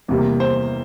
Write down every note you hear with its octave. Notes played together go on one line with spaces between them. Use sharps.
E2 C3 G3 A#3
C5